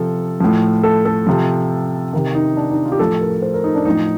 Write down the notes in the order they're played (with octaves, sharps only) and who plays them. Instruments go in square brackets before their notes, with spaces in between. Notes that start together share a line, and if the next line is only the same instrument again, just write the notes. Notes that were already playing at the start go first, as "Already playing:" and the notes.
Already playing: [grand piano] C3 F3 A4
A2 F3
A4
A4
C3 F3
C3 D#3
D#4
D4
D#4
F4
G4
A2 F3 A4
A#4
C5
A#4
D#4
D4
A2 F3 D#4